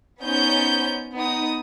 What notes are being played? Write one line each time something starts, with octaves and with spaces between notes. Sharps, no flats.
B3 C#4 D#4 C5 G6
B3 D#4 D#6